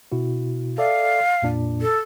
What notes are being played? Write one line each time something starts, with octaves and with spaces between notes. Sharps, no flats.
B2 E4 F#4
A4 D5 E5 F5
F2 A#2 D4
A4